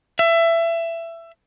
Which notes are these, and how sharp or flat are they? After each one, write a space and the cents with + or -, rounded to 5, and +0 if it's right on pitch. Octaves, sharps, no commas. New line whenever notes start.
E5 +20